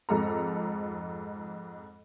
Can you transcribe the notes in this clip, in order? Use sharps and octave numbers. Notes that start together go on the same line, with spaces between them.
F2 G#2 A4 A#5